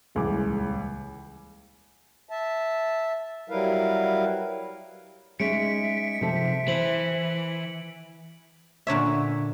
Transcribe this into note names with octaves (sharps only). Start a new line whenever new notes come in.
D#1 C#2 E3 D6
E5 A5
F#3 G3 E4 A#4 B4 F5
G#3 C#4 D#4 E5 C#7 D7
C3 F3 A4
E3 C5 F#7
A#2 D3 C#5 E5